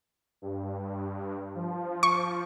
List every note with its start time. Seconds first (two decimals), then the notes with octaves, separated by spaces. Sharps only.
0.42 G2
1.55 F3
2.03 C#6